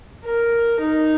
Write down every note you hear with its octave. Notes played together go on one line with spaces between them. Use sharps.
A#4
D#4